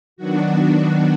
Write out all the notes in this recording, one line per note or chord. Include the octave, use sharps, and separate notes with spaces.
D#3 F#3 B3 D4 F#4